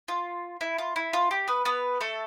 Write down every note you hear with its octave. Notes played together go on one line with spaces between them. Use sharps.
F4
E4
F4
E4
F4
G4
B3 B4
B3 B4
A3 A4